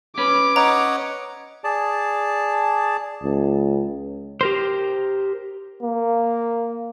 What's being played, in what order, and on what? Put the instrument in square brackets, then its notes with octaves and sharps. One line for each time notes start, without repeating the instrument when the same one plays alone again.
[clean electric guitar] C#4 B4 [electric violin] D6
[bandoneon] C#5 D#5 F#5 [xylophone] A#5
[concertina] G#4 D5 A5
[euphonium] C#2
[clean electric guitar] G4 A#4 C5
[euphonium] A#3